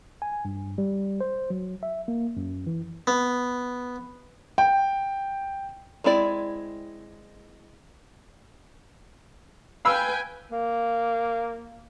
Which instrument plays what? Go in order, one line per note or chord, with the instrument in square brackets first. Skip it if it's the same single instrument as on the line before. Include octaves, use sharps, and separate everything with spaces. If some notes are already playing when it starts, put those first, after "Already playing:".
[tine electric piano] G#5
G2
G3
C5
F#3
E5
A#3
F#2
E3
[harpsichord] B3
[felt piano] G5
[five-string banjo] G#3 C4 E4 D5
[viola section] B4 G5 G#5 [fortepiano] F5 B5 E6
[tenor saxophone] A#3